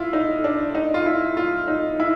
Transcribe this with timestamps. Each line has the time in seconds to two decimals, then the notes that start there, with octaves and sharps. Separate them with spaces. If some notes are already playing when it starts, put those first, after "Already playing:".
Already playing: E4 F4
0.13 D#4
0.44 D4
0.75 D#4
0.94 F4
1.06 E4
1.37 F4
1.68 D#4
2.00 E4